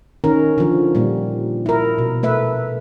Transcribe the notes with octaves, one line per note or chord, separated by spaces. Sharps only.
D#3 C#4 A#4
D3 F3
A#2 G3
E4 A#4
B2
A3 B4 E5